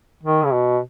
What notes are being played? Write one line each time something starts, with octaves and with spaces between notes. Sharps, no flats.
D#3
C#3
B2